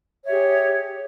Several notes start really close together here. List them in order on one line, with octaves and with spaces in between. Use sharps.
C#5 E5 G4 G#4